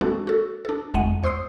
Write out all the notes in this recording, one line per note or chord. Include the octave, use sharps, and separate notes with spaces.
G#3 A#3 C4 D4 F#4 A4
F#4 A4
D4 A4
G1 F2 G#3 A3 F#5 D#7
E2 C5 C6 D#6 E6 C7